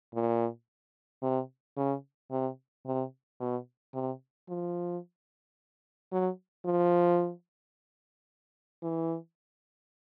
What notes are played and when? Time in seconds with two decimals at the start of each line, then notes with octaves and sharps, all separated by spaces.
0.14 A#2
1.23 C3
1.77 C#3
2.31 C3
2.86 C3
3.40 B2
3.94 C3
4.49 F3
6.12 F#3
6.66 F3
8.83 E3